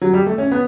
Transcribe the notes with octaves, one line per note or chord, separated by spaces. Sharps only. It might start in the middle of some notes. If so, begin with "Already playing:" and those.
F#3
G3
A3
C#4
B3